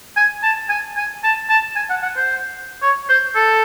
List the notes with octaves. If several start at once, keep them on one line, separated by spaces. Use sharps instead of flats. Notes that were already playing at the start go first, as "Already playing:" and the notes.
G#5
A5
G#5
G#5
A5
A5
G#5
F#5
F#5
C5
C#5
C5
A4